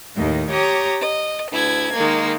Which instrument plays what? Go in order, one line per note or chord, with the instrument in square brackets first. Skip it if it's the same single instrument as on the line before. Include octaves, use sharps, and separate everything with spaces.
[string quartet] D#2 A2 D#3
G4 C#5 A#5 D#6
D#5
D2 E4 G#6
D#3 G#3 A#3